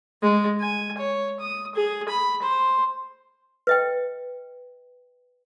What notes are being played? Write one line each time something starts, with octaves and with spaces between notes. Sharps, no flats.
G#3
G#5
C#5
D#6
G#4
B5
C5
B4 D#5 G5